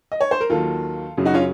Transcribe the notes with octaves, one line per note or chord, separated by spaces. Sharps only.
D#5
C#5
C5
A#4
D#2 D#3 F#3 F4 A4
F#2 C#3 F#3
D#4 F#4
C#4 F4